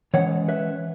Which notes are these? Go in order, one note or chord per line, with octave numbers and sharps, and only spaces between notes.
E3 G#3 C#4 C#5 F#5
B4 E5